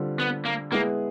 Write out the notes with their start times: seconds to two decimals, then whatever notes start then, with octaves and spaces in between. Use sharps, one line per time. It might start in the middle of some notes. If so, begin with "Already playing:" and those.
Already playing: D3 G3 C4 F4
0.19 B3
0.45 A#3
0.71 G#3 A#3 B3 E4 G#4